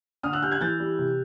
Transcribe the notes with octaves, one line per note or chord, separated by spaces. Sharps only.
D3 D#6 F6
E6 F#6
G3 F6 G6
F#6 G#6
E3 G6 A6
G3
C3